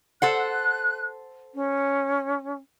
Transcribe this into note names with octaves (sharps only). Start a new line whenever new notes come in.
A4 C5 F#5 F#6
C#4